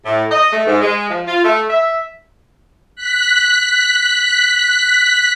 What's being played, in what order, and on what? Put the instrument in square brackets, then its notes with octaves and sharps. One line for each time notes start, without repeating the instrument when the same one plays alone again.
[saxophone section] A2
D#5
A3
G#2
G#3
F3
F4
A3
E5
[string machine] F#6 B6